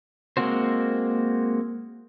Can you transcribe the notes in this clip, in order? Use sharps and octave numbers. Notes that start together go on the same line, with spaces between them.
G#3 A#3 C4 F#4 C5